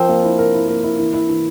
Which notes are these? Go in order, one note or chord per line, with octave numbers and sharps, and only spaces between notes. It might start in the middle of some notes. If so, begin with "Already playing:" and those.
Already playing: F3 C4 A#4
A#3
E4
A#4
E4
A#3
E4
E3
E4
E3